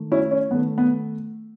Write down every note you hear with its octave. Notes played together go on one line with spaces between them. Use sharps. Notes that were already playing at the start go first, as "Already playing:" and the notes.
Already playing: D#3 A3
C#4 E4
C#4
D#3 A3 B3
B3